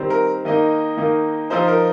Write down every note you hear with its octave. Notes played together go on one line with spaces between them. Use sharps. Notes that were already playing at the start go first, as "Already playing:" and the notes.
Already playing: D#3 G3 C4
A#4
D#3 A#3 D#4 D#5
D#3 A#3 D#4
F3 D#4 C5
A#4